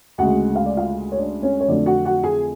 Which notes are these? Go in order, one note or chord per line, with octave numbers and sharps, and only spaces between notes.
D2 C#3 G#3 F#4 F#5
F5
D5
F4 F5
C#5
D4 D5
C#4 C#5
C#5
F2 D3 F#3 A3 D4 D5
F#4 F#5
F#4 F#5
G#4 G#5